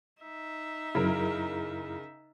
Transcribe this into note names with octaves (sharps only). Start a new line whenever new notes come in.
D#4 E5
F#2 C#3 E4 A#4